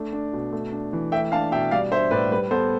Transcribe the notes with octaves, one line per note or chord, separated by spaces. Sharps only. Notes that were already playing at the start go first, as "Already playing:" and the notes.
Already playing: A3 D4
D4
B2
A3
D4
E3
A3 E5 G5
D4 F5 A5
B2 E5 G5
G3 D5 F5
D4 C5 E5
A2 B4 D5
G3 B4
B3 A4 C5